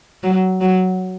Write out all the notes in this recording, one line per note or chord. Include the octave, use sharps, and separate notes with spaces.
F#3
F#3